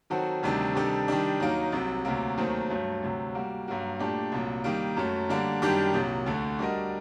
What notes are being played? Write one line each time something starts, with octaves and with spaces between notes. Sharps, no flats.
D#3 F#3 C4 F#4 A4
D2 C3 D#3 G3 D4
C3 D#3 G3 D4 A4
D#3 G3 D4
D#2 D#3 F#3 A#3 D#4
C2 C3 F#3
D2 C3 F#3 A#3
D#2 D#3 F#3 A3 C4
G2 F#3 A3
D2 C3 F#3
G3 A#3 F#4
G2 F#3 A#3 F#4
A#2 A3 D4 G4
C2 A#2 F#3
D#3 G3 A#3
F#2 F#3 A3
D3 G3 A#3 D4
F#2 D#3 G3 D4 G4
C2 A#2 F#3
D2 D3 A3
G3 D4 F#4 A#4 D#5